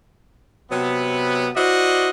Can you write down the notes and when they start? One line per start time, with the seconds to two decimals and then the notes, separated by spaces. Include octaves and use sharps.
0.71 C3 F#3 B3
1.56 E4 F#4 C5 D5 D#5